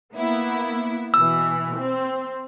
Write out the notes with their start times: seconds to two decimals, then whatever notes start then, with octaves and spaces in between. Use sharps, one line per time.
0.13 A#3 B3 E4
1.14 B2 E3 E6
1.78 C4